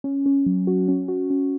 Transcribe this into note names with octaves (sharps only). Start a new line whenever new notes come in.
C#4
C#4
F#3
F#4
C#4
F#4
C#4